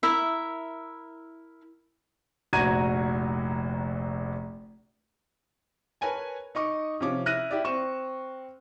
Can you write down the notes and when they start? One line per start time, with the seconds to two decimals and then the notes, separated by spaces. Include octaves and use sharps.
0.03 E4 A#4 E5
2.53 F1 A#1 F#4 A#5 G#6 D#7
6.01 A#4 B4 C#5 G#5 A5
6.55 D#4 D#5 C#6 D6
7.00 C3 F3 C#4 D6
7.26 E4 F6 F#6 A#6 D#7
7.51 E4 G4 D5
7.64 C4 C#6 E7